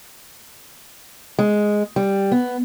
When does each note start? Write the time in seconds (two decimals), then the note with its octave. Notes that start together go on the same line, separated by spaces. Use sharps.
1.39 G#3
1.96 G3
2.32 B3